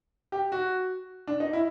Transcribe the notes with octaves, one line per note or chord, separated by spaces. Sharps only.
G4
F#4
D4
D#4
E4